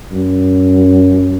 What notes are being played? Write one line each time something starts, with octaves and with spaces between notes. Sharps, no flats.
F#2